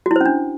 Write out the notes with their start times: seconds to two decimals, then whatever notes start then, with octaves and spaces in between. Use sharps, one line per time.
0.06 F#4
0.11 E4
0.16 C5
0.21 C#4
0.26 D4